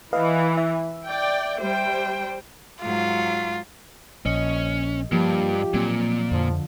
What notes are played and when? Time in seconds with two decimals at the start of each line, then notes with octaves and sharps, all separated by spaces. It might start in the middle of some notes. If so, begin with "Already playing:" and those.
0.13 E3 B4 D#5 F5
0.57 E5
1.05 D5 G5
1.60 G3 C5 G5
2.83 G#2 F#3 F4
4.26 A#1 C#4 D#5
5.12 G2 F3 A#3 G4
5.74 A#2 F#3 A#3 C4
6.31 F2 D3 F3